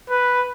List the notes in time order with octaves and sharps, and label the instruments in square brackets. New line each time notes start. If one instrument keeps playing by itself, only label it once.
[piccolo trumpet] B4